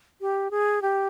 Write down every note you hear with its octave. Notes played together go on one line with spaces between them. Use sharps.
G4
G#4
G4